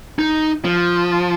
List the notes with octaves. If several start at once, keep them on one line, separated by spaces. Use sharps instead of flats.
D#4
F3